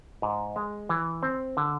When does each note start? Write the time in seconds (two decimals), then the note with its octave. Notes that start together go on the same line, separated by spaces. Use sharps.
0.22 G#2
0.56 G#3
0.89 E3
1.23 C4
1.57 D3